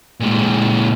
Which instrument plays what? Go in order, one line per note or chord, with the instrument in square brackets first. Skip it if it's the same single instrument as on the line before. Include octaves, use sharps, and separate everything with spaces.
[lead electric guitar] A#2 G#3